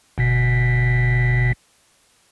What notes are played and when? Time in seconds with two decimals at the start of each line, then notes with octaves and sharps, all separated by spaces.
0.18 G1 B2 B6